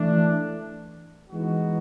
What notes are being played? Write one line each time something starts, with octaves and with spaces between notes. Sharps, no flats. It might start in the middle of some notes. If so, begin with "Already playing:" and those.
Already playing: E3 A3 D4
E3 G#3 B3 D#4 F#4